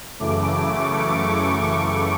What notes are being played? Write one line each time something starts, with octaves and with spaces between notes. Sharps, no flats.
F#2 C#3 E3 A3 D6
C#6